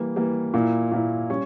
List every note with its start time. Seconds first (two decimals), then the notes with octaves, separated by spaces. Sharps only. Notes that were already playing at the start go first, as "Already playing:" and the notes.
Already playing: E3 G3 A#3
0.16 E3 G3 A#3
0.54 A#2 A#3 E4
0.91 A#2 A#3 E4
1.30 G3 C#4